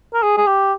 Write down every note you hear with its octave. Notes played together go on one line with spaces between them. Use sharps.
A#4
G#4
G#4
G4